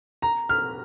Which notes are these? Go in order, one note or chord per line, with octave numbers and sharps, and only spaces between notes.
A#5
F6